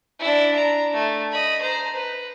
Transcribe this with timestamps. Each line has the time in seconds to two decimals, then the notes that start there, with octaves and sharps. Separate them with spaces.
0.19 D4 E4
0.55 A#5
0.93 A3
1.32 D#5 B5
1.61 C5 A#5
1.95 B4